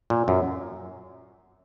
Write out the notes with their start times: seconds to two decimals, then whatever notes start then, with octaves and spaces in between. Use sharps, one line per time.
0.10 A#2
0.28 F#2